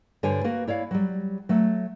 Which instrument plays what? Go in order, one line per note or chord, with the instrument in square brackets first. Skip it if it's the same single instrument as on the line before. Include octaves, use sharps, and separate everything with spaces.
[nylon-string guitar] G2 D3 G4 C5 C#5 G#5
A#3 F#4 B4
E4 C#5 D5 F5
F#3 G3
F#3 A3